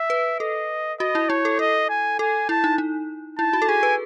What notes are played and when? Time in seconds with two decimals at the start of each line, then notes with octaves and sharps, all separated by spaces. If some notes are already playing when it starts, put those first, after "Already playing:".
Already playing: E5
0.10 B4
0.40 A4 D#5
1.00 F#4 D#5
1.15 E4
1.29 E4 C#5
1.45 A4
1.59 A4 D#5
1.89 G#5
2.19 A4 G#5
2.49 E4 A5
2.64 D#4
2.78 D#4
3.38 E4 A5
3.53 F#4
3.62 A4
3.68 G#4 G#5
3.83 B4